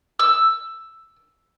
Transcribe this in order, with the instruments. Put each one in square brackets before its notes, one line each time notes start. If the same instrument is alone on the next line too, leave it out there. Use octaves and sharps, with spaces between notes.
[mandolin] E6